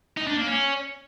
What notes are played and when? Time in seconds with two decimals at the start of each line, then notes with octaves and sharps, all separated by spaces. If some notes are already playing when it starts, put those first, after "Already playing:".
0.17 D#4
0.27 D4
0.37 A#3
0.47 C#4